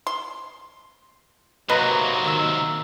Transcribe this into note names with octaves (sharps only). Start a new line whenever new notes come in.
C6
G#2 C3 F#3 A#3 B4 D#5 A#5
D#3 E6